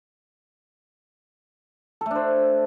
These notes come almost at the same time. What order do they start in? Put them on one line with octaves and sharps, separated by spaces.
A4 A3 D4 C5